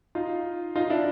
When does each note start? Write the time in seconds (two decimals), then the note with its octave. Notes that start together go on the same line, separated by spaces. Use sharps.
0.15 D#4 F4
0.76 D#4 F4
0.90 D4 E4